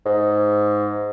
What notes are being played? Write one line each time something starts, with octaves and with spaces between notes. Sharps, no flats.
G#2